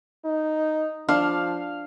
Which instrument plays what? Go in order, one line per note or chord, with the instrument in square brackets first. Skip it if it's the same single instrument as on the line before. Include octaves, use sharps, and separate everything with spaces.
[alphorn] D#4
[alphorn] F3 [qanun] D4 [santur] F5